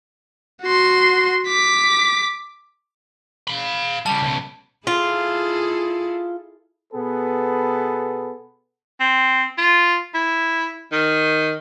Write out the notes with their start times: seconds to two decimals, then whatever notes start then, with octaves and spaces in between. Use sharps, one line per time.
0.62 F#4 C6
1.47 D6 B6
3.48 F5 B5
4.06 C#3 G3 A5
4.22 C#2 B2
4.87 E4 F4 G#4 A4
6.94 B2 B3 G#4 A4 B4
9.01 C4
9.58 F4
10.14 E4
10.92 D#3